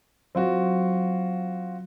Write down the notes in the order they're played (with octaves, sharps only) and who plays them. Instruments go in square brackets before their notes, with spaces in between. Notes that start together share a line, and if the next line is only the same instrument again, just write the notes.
[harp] F#3 [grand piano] C4 F4 F#4